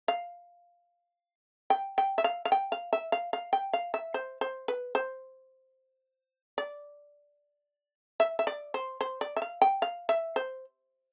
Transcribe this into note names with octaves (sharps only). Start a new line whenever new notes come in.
F5
G5
G5
E5
F5
F5
G5
F5
E5
F5
F5
G5
F5
E5
C5
C5
B4
C5
D5
E5
E5
D5
C5
C5
D5
E5
F5
G5
F5
E5
C5